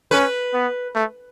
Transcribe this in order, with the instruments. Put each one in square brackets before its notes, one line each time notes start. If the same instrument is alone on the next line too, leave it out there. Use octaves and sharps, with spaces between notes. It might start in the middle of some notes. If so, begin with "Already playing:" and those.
[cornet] C#4 [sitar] B4
[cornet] B3
A3